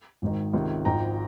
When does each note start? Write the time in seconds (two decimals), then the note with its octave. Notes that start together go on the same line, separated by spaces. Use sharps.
0.22 G#1 G#2 D#3
0.53 C#2 C3 D#3
0.85 G#1 G#2 F3 G5 A#5